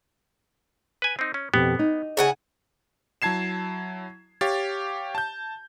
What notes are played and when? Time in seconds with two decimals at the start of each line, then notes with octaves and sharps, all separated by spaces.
1.02 B4 G#5
1.19 C4 D#4
1.34 C#4
1.54 F2 B2 B3 G4
1.79 D#4
2.17 C#3 A4 F#5 G#5
3.22 F#3 E4 A5 G#6 C7 E7
4.41 G4 C#5 F5 A6
5.15 A5 G6